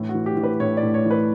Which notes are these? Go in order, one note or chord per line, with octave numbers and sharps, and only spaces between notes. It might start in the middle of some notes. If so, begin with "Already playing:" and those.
Already playing: A2 E3
F#4
E3
G4
E3
B4
A2 C#5
D5
A2
C#5
E3
B4